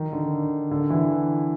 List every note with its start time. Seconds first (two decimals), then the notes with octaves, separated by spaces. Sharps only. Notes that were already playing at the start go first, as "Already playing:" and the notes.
Already playing: D#3
0.13 D3
0.71 D3
0.90 E3